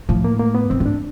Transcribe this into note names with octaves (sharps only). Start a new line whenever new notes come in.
A2 F3
A#3
A#3
B3
G#2 C4
G#2
D4